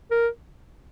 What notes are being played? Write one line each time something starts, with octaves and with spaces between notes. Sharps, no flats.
A#4